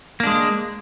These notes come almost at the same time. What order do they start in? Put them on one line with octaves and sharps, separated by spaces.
A#3 D4 G#3